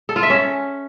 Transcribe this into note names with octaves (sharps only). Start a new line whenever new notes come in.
A4
F4
E5
C#4